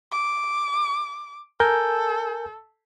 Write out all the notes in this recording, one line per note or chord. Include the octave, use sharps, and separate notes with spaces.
D6
A4 A#4 G#5 G6